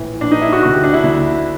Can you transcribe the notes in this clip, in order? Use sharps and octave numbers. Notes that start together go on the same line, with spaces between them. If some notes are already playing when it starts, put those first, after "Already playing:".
Already playing: A#1 A2 E3
A#1 A2 E3 D4
D#4
E4
F#4
D2 D3 F#4
G4
D4
E4
D2 D3 E4